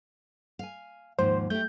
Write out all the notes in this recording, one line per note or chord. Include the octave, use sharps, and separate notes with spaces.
F5 G#5
D#2 G#2 F3 C5
A3 G4 G6